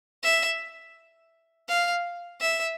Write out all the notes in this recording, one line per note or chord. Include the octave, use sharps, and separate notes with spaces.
E5
F5
E5